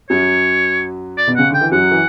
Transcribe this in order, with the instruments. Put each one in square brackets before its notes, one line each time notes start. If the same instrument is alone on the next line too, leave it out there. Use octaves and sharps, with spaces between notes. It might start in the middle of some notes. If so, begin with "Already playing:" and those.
[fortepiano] F#2 F#3 [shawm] C#5
[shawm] D5
[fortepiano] B2
[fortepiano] C#3 [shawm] F#5
[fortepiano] D3 [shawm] G5
[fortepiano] E3
[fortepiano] F#2 F#3 [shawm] F#5
[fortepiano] E3